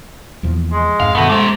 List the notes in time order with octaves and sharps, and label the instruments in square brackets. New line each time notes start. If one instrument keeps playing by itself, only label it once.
[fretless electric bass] E2 A#2 F3
[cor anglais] G#3
[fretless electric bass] F2 G#2 [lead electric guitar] F5
[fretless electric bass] G2 D#3 [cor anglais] A3 [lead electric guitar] B3 F#4
[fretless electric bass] G#3 [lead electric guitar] A#3 C5